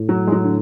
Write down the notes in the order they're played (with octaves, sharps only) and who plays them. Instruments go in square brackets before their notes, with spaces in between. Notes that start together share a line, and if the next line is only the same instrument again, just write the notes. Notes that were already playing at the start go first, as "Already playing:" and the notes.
Already playing: [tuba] A2
[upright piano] F#3
G#3
F#3
D3